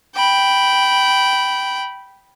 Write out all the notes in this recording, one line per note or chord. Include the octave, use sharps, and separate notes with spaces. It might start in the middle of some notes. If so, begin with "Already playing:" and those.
G5 B5